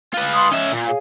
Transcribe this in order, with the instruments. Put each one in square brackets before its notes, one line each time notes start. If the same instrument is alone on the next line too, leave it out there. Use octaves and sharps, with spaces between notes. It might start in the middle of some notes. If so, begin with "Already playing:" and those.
[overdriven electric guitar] F4 B4
[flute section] C6 D6 D#6
[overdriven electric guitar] C#4 E5 [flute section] D#5
[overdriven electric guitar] A#2 [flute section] F4 A#5
[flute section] G#4 C#5 F5